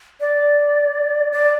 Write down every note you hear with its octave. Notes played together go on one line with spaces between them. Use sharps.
D5
D5